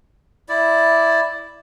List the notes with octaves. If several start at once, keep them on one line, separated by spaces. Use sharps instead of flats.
E4 D5